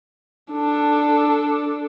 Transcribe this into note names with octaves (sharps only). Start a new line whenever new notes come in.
D4 A4